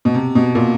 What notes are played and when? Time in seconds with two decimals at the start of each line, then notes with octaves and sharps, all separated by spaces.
0.05 B2
0.14 C3
0.35 B2
0.55 A#2